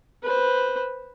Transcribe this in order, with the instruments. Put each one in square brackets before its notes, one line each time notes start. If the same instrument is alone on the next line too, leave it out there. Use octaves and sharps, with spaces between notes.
[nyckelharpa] B4 C5